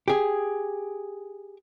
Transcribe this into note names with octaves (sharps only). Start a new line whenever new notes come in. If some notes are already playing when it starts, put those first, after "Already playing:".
G4 G#4